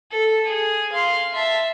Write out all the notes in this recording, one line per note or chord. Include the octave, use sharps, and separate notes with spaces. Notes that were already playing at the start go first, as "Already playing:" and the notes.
A4
G#4
F5 C6
E5 A5